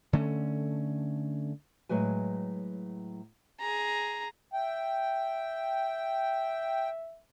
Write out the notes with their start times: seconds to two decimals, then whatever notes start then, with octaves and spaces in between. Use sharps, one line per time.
0.13 D3 A3 C#4
1.89 A2 F#3 G#3 B4 G#5
3.60 G#4 A#5
4.53 E5 G5